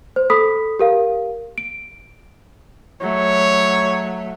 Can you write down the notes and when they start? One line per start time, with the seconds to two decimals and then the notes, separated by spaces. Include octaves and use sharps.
0.16 C5
0.30 A4 B5 D#6 B6
0.79 G4 A#4 F5
1.58 D7
3.01 F#3 A3 C#5